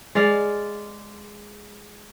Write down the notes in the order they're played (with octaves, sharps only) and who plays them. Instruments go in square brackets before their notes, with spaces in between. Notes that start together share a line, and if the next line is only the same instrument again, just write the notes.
[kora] G#3 D5 F5